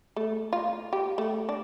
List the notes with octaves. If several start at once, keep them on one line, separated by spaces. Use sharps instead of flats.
A3
F4
G4
A3
D4